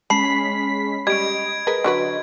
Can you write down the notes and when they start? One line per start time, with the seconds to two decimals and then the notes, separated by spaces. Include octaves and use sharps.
0.10 G#3 C#4 A5 B5 B6 C7
1.07 G3 C#4 D#5 G#6 D7
1.67 G#4 A#4 B4
1.84 D3 F#3 B4